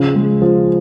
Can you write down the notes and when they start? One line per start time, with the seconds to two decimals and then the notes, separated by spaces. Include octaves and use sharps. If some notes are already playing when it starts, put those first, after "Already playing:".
Already playing: C#3 F3
0.15 G#3
0.42 F3